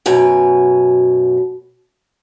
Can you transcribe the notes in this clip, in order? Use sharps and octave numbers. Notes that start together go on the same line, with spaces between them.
F#2 B2 G#5 A#5